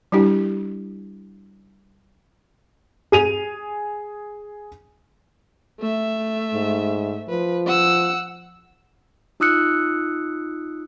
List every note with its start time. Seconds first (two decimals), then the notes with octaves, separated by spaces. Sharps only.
0.12 G3 D4 E4 G4
3.12 G#4 D#7 F7
5.80 A3 E5
6.54 G#2
7.29 F3 B4
7.66 F#5 E6
9.40 D#4 F4 D#6 E6 F#6 C#7